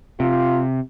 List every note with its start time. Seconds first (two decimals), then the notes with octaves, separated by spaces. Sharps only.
0.20 C3 F4